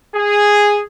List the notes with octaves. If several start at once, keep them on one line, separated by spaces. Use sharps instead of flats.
G#4